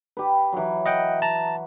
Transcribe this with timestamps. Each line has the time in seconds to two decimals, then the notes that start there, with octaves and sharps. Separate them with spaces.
0.17 G4 B4
0.53 E3 F#3
0.86 D#5 F#5 G5
1.22 A5 A#5